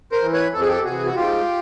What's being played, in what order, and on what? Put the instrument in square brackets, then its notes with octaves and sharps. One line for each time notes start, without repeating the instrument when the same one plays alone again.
[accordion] A#4 C5
E3
B4 C#5
F2 A4
G#4
G4 A4
C3 E3 F#4 G#4
F#4
G#2 F4 G4